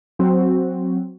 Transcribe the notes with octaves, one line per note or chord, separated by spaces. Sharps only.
F#3 C4 F#4